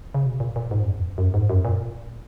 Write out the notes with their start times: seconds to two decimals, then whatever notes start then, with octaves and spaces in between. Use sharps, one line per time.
0.14 C#3
0.26 B2
0.40 A#2
0.56 A#2
0.71 G#2
0.82 F#2
0.91 E2
1.01 F#2
1.18 F#2
1.34 G#2
1.50 F#2
1.65 A#2